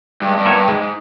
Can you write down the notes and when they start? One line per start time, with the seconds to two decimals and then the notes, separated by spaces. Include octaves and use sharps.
0.22 G2 G#3
0.37 G2
0.45 B3 E4 A#4 C#5
0.52 G2
0.68 G#2 G#3